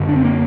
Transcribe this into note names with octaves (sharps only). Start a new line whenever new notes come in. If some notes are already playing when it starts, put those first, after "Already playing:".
Already playing: F#2 D3
D4
C4
A#3